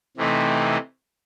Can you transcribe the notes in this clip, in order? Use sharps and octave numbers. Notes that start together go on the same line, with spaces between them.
C3 E3 A3 C4 D#4